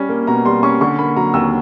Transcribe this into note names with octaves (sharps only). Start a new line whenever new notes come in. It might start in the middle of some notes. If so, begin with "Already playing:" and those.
Already playing: G3 C#4
A#3
B2 A#5
G3 C6
C#4 C#6
D3 C#6
A#3 B5
F#3 A#5
D#2 E6